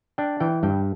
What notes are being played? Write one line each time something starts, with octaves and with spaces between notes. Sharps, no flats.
D4 G5
E3 G5
G2 G5